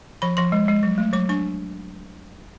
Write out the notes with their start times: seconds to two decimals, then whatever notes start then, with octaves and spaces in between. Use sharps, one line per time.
0.22 F3 B5
0.37 F3 C6
0.52 G#3
0.68 G#3
0.83 F#3
0.98 A3
1.13 F#3 D6
1.29 D4 C#6